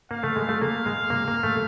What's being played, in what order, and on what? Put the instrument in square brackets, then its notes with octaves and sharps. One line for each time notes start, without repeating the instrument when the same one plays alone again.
[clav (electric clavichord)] A#3 [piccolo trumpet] F5
[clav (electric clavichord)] A3
G#3
A3
[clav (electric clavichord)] A#3 [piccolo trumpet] F5
[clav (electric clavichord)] G#3
A#3
A#3
A3